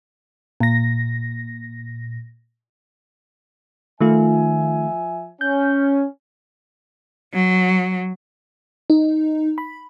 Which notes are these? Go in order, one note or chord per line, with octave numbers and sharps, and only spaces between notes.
A#2 A#6
D#3 F3 A3 F4 E5 G#5
C#4 G6
F#3
D#4
B5